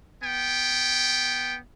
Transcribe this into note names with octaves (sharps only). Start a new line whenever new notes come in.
B3 G5